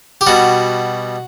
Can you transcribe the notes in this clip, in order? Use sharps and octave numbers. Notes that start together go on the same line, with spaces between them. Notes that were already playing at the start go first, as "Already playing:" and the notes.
G4
B2 G3 F#4